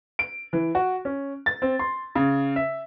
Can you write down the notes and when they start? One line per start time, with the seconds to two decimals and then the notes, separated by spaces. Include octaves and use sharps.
0.19 D7
0.53 E3
0.75 F#4
1.05 C#4
1.46 A6
1.62 C4
1.79 C6
2.15 C#3
2.56 E5